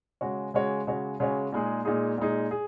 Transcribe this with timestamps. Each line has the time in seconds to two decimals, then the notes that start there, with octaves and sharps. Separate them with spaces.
0.21 C#3 G#3 F#4 C#5
0.54 C#3 G#3 F#4 C#5
0.87 C#3 G#3 F#4 C#5
1.20 C#3 G#3 F#4 C#5
1.52 A#2 G#3 D#4 G#4
1.85 A#2 G#3 D#4 G#4
2.18 A#2 G#3 D#4 G#4
2.51 G#4